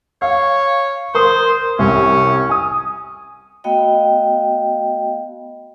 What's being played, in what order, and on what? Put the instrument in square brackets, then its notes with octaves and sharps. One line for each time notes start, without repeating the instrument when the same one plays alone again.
[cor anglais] C#5 [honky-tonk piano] F5
[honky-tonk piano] A#4 C6 D#6 [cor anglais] C5
[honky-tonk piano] C2 [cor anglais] C#4
[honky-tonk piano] G#5 D#6
[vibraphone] A3 B3 F#4 D#5 F5 G5